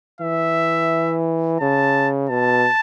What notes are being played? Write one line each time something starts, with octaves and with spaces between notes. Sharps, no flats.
E3 E5
C#3 A5
B2 A5